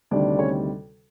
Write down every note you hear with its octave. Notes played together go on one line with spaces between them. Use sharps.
D2 C3 D#3 G3 D4 D5
C#4 C#5